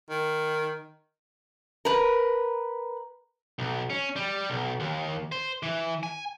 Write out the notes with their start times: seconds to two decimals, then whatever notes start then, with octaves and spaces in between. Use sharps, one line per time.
0.10 D#3
1.85 A#4 B4
3.59 B1
3.90 C#4
4.16 G3
4.50 B1
4.80 D#2
5.32 C5
5.63 E3
6.03 G#5